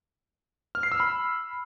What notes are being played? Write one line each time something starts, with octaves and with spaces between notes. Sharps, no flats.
F6
C7
E6
B5